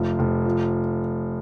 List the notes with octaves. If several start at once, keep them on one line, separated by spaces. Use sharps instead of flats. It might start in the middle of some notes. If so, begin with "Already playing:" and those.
Already playing: F1 F3
F1
F3